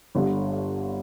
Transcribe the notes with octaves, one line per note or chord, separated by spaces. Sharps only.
G1 G2 D3